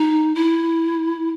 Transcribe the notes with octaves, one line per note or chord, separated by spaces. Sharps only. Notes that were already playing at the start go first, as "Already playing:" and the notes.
Already playing: D#4
E4